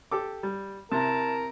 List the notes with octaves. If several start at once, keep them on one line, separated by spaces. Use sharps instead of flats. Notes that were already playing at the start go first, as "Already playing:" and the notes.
G4 A4 D6
G3
C3 E4 A#4 A5